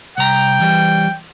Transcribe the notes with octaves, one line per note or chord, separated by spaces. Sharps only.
C2 G5 A#5
E3 G3